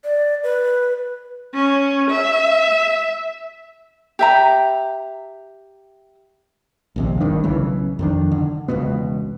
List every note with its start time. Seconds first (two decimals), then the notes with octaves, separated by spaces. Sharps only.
0.04 D5
0.44 B4
1.54 C#4
2.10 E5
4.19 G4 E5 A#5
6.96 A#1 D#2 C3
7.20 G#1 G2 D#3 D4
7.44 B1 C#3 E3
7.99 F2 D#3 D4
8.31 D3
8.68 E1 C#2 B2 B3